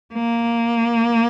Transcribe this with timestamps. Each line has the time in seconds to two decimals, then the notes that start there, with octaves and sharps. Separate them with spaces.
0.14 A#3